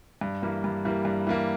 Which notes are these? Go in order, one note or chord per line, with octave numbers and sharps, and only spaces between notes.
G2
E3 G3 A#3
G2
E3 G3 A#3
G2
E3 G3 A#3